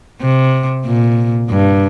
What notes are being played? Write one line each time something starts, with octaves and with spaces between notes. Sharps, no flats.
C3
A#2
G2